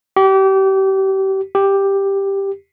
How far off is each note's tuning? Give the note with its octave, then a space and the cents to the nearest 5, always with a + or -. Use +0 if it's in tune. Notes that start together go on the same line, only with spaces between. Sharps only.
G4 -30
G4 +5